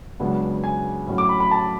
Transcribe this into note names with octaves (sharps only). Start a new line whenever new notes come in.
C#2 C#3 F#3 B3 D4
G#5
A2 F#3 C#4
D6
B5
B5
A5